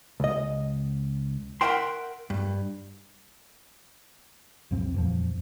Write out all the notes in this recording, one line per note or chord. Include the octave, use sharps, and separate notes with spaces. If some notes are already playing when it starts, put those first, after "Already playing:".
C#2 D#5
A#4 B4 E5 F#5 G5 C6
G2
B1 F2 C4
D#1 F2 F3